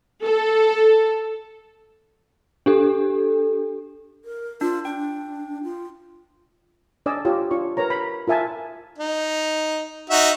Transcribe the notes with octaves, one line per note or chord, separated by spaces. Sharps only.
A4
D4 G4 A4
A#4
D4 F4
D4 G5
F4
D4 D5 D#5 G#5 E6
F4 G4 C#5
D4 F4 C#5 C#6
A#4 B4 C#5 A#5
B5
F4 A#4 E5 G#5 A5
D#4
D#4 F#4 E5